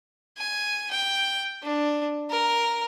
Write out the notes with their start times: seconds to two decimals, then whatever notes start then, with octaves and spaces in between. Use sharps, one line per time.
0.37 G#5
0.91 G5
1.62 D4
2.30 A#4